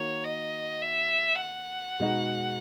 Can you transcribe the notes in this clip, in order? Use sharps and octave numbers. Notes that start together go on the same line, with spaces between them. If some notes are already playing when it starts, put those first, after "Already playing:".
Already playing: D#3 A#3 F#4 C#5
D#5
E5
F#5
B2 G#3 D#4 F#4